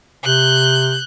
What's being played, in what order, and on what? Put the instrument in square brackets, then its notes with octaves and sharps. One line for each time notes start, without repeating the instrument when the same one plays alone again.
[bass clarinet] C3 [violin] F#6 G6